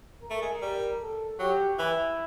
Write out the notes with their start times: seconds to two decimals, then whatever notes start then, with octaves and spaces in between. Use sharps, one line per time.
0.22 A#4
0.30 A3
0.42 G#3
0.61 G3 A#4
1.01 A4
1.40 F#3 G4
1.79 E3 E4